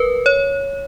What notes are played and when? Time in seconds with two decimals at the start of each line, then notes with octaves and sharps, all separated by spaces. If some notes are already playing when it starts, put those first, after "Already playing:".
Already playing: A#4 B4
0.26 C#5